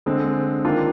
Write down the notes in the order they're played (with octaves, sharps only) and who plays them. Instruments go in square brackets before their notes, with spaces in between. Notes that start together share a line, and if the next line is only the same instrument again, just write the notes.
[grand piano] D3 G#3 C4
D#3 A#3 D4 F4